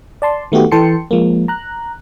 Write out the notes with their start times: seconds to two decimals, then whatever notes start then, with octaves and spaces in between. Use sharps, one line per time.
0.22 D5 A5 C6
0.52 D#3 A3 B3 F#4 G4
0.71 E3 A4 G5 A5 C6 C#7
1.11 F3 G#3 A#3
1.48 A#5 F#6